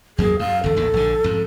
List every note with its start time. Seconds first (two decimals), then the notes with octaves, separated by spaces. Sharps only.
0.18 E2 F#3 A#3 G#4
0.39 F#2 F5
0.64 G1 E2 A4
0.76 A1 D#2 D#3
0.94 A#1 D3
1.24 F2 G#2